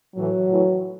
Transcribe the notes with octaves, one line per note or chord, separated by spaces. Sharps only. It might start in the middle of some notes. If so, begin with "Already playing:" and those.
A2 E3 F#3
A2 E3